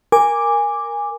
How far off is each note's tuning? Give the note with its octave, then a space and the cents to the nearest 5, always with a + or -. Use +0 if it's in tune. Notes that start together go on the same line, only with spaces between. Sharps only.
A#4 +0 G#5 -15 D6 +0